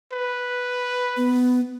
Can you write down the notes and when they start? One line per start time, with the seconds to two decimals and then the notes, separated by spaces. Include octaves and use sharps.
0.12 B4
1.17 B3